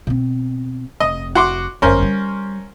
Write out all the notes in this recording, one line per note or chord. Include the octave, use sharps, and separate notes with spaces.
B2 C4
F1 D#5
F#4 C6 D6
G1 F#2 C#4 A#4 C5
G3